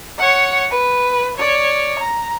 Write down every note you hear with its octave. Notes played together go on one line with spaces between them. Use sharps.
C#5 F#5
B4
C#5 D5
A#5